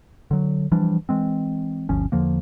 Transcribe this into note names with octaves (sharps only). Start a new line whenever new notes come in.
D3 F#3
E3 F3 G3 D4
E3 G#3 C4
G1 D2 F3 C#4
E2 D3 F3 A#3